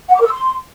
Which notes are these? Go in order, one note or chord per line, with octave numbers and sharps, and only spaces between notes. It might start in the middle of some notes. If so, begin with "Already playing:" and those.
F#5
D6
A#4
E6
C6